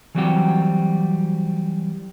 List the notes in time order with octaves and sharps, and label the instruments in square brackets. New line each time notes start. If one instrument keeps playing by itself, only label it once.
[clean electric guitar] E3 F#3 G3 C4 F#4 G4